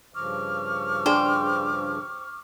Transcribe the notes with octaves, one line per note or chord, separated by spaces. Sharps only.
G2 C#3 F3 C#6 D6 F6
D4 G#4 C5 G5